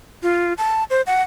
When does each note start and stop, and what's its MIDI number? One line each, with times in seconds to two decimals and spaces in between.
0.23 0.53 65
0.58 0.84 81
0.90 1.02 72
1.07 1.22 78